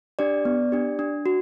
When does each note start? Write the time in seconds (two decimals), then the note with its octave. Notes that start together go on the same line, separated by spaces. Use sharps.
0.19 D4 G4 D5
0.45 B3
0.72 D4 G4
0.99 D4
1.26 F#4